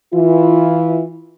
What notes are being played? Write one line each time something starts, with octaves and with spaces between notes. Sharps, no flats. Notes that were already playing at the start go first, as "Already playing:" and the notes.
E3 E4 F4